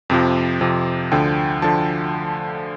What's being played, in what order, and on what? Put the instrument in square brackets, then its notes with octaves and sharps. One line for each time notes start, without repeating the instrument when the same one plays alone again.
[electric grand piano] F2 C3 F3
F2 C3 F3
D2 D3 F3 G5
D3 F3 A5